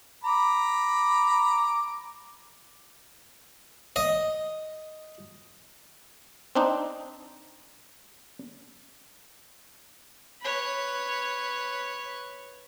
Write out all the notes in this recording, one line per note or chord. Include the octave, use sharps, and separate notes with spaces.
A#5 B5 D6
D#5
C4 D4 D#4
B4 C#5